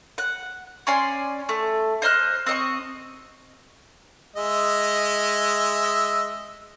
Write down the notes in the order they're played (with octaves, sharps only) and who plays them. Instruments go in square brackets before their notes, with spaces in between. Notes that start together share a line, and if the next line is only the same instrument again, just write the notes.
[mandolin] F#5
C#4 D5 G#5 C6
A3
C5 D#5 F6 F#6
C4 D#5 C#6
[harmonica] G#3 D#5 E5